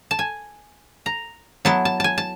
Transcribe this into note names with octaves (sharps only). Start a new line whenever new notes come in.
A5
G#5
A#5
F#3 B3 E4 A5
A5
G#5 A5
A5